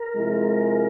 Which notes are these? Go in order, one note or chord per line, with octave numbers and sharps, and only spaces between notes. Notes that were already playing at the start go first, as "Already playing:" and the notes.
Already playing: A#4
C3 F3 G#3 E4